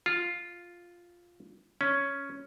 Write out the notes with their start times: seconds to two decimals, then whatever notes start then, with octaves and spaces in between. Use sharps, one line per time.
0.06 F4
1.81 C#4